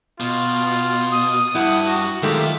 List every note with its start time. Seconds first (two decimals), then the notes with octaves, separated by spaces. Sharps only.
0.20 B2 F4
1.12 D#6
1.55 G2 E4 F#5
1.87 F#4
2.23 F#2 D#3 G#3 A3 F4 G4 E5